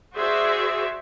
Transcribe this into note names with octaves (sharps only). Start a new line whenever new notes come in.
F#4 G#4 C5 D5 E5